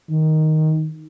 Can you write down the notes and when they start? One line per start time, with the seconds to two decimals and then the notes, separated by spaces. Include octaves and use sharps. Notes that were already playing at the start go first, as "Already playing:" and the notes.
0.10 D#3